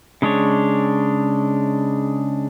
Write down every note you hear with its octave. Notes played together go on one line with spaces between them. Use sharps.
C#3 G#3 D4 C#5